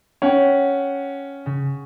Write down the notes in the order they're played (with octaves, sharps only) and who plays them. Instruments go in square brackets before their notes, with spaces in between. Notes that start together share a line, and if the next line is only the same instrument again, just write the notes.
[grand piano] C#4 [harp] F#5 G5
[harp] C#3